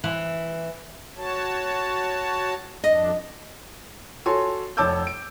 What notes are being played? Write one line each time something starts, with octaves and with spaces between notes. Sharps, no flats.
E3
F#4 C#5 A5
F2 D4 D#5
F#4 A4 C#5 G#5 C6
F1 C#5 A5 D6 E6 G6
D7